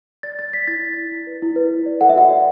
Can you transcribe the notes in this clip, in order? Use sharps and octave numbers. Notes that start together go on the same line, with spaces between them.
D5 A6
D5 A6
D5 B6
E4 A6
D5
E4
E4
B4
E4
B4
E4
D5
A4 F#5
E5
F#4 F#5
D5